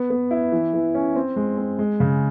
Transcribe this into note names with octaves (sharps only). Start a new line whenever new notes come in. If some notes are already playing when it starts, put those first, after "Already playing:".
Already playing: B3
B3
E4
E3
E3
C#4
C4
G#3
C4
G#3
C#3